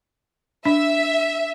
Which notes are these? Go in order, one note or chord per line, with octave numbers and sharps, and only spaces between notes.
D4 E5